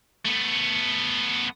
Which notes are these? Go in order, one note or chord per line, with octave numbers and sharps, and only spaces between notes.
A3 B3